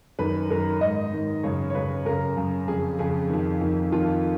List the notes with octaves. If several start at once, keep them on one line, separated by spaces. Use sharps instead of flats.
F#2 D#3 B4
F#2 D#3 A#4
G#2 D#3 D#5
G#2 D#3
F#2 C#3 C#5
C#5
F#2 C#3 B4
F#2 C#3 A#4
F#2 C#3
F2 C#3 G#4
F2 C#3 G#4
F2 D#3
F2 D#3
F2 D#3 F4